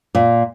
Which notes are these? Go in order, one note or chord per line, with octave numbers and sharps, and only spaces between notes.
A#2